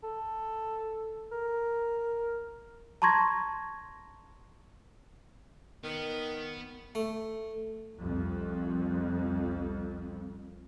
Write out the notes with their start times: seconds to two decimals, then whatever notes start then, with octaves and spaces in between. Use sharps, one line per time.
0.04 A4
1.32 A#4
3.02 A5 A#5 C6 C#6 G#6 A#6
5.84 D#3 B3
6.95 A3
7.97 C2 F2